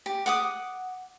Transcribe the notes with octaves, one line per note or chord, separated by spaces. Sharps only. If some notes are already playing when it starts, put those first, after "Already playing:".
G4
F#5 D6 D#6